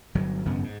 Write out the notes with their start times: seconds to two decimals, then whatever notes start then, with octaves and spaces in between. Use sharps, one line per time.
0.15 G1 F#3
0.45 G#1 F#2 C#3 B3
0.64 G#2